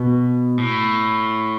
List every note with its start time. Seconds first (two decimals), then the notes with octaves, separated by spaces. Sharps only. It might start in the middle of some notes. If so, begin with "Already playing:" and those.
Already playing: B2
0.58 A2